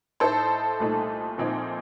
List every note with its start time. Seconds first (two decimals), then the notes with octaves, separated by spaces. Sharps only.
0.20 A2 A3 D#4 A4 C5
0.80 C2 A#2 A3 D#4
1.38 A#1 A#2 F3 C4 D#4